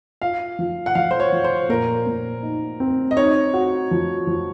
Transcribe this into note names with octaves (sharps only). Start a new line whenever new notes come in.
F4 F5
F3
F#5
F3 F5
C5
C#5
F3
C5
A#2 A#4
A#2
D#4
C4
D#5
D#4 C#5
F#4
F3
F3